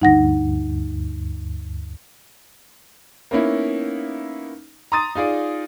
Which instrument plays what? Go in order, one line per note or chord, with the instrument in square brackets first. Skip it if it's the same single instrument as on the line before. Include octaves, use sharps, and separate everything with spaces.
[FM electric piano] D2 G2 [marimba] D#4 F#5 A#6
[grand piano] A#3 B3 C#4 D#4 E4
A#5 C6 D#6 A6 D#7
D#4 F4 G#4 D5